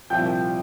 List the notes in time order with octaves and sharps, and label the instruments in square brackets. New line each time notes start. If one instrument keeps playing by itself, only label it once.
[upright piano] C2 A#2 F3 G5 G6